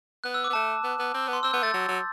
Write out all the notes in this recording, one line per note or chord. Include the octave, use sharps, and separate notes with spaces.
B3 F#6
E6
D6
B3
A3 A5
B3
B3
C4
B3
C6
C4 E6
B3 G6
A3 A6
F#3 G6
F#3